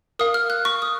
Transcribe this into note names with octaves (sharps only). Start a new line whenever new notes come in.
A#4 F5 D#6
F6
F#6
C#6
D#6